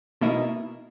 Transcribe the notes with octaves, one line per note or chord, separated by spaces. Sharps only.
B2 A#3 D#4 E4